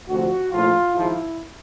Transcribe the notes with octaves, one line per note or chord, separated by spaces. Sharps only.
D2 C3 F3 F#4
A#1 A2 F3 F4
G#1 G#2 F3 E4